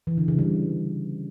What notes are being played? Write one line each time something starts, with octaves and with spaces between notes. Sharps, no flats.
E3
D3
C#3
G3